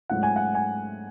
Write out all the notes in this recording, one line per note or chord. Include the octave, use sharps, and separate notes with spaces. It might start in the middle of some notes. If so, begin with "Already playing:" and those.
G#2 F#3 A3 C#4 F4 F#5
G#5
F#5
G#5